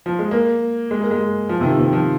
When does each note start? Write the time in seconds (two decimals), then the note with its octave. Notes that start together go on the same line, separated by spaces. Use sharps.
0.06 F3
0.19 G#3
0.31 A#3
0.91 G#3
1.01 A#3
1.11 G#3
1.49 F3
1.60 C3
1.64 D#3
1.79 C3
1.93 F3